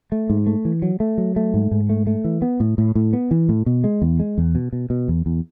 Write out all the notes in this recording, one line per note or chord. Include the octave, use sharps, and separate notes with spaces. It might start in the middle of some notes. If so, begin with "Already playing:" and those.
A3
G#2
A3
E3
F#3
A3
F#3
A3
G#2
G#2
A3
A3
E3
B3
A2
A2
A2
B3
E3
A2
B2
G#3
E2
G#3
E2
B2
B2
B2
E2
E2